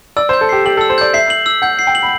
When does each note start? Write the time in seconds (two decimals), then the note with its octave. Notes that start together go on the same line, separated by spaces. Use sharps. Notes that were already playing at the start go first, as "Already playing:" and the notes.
0.17 D5 E6
0.29 C5
0.33 G6
0.41 A4
0.49 G4 C7
0.65 G4 F#7
0.77 A4
0.81 E6
0.90 C5
0.98 D5 G6
1.14 E5 C7
1.30 F#7
1.46 E6
1.62 F#5 G6
1.79 C7
1.87 G5
1.95 F#7
2.03 B5